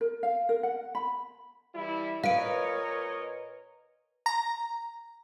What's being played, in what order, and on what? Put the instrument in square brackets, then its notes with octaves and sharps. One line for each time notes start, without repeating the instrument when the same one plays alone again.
[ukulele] A#4
F5
A#4
F#5
B5
[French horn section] E3 G3 E4
[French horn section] A#2 D#5 [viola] A#4 C#5 [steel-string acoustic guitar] B4 [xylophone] F5 D7
[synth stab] A#5